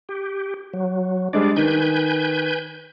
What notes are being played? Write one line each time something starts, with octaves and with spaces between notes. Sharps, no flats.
G4
F#3
G3 G#3 D4 D5
D#3 B4 G#5 G6